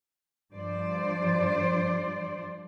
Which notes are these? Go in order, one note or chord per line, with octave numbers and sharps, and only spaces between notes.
G2 F3 C5 D5